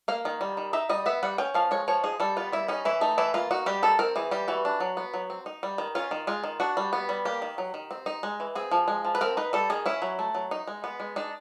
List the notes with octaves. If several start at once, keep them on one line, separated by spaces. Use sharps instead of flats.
A#3 F5
D#3
G3
D#3
D#4 E5
G3 D#5
B3 E5
G3 F#5
C#4 G5
F3 F5
G#3 C#5
F3 C#5
D#4 G#4
G3 A4
B3 F4
G3 E4
C#4 D#4
E3 E4
A3 D#4
E3 E4
A#3 F4
D#4 F#4
G3 G4
D#3 A4
C4 A#4
E3 G#4
G3 G4
E3 F#4
D4
F#3
B3
F#3
C4
D#4
G3
D#3
C#4 F4
D#3
G#3 F4
D#3
D4 F#4
G3
B3
G3
A#3 G4
D#3
F#3
D#3
C4
D#4
G#3
E3
C4 G#4
F3
G#3
F3
B4
C4 A#4
D#4 B4
G3 A4
D#3 G#4
C#4 E4
F#3
A3
F#3
D#4
G#3
B3
G#3
D4 D#4